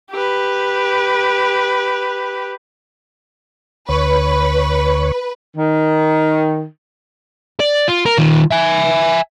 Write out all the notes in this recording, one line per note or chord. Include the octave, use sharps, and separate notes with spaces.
G4 B4
D2 B4 C#5
D#3
D5
F4
A#4
D#3 F4
E5 G#5